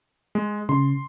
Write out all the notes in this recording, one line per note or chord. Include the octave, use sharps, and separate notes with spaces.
G#3
C#3 C6